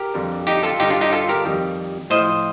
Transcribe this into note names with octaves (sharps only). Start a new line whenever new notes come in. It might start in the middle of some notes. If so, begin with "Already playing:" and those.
Already playing: G4 A#4
F2 D3 G3
D#4 G4
F4 A4
G2 D3 G3 D#4 G4
D4 F4
D#4 G4
F4 A4
G4 A#4
F2 D#3 G3
A2 F3 C5 D#5